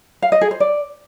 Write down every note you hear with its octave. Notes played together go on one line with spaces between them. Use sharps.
F5
D#5
G#4
C5
D5